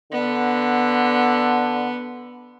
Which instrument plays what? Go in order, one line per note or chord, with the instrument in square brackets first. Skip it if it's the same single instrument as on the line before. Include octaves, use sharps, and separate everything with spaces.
[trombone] D3 [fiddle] B3